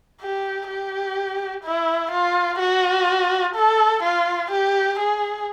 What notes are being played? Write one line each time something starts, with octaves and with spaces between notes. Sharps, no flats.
G4
G4
E4
F4
F#4
A4
F4
G4
G#4